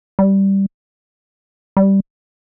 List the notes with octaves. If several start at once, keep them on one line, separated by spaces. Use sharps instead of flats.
G3
G3